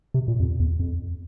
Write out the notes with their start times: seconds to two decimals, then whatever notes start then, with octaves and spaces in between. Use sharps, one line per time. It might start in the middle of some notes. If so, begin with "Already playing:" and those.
0.14 C3
0.28 A#2
0.40 F2
0.60 E2
0.79 F2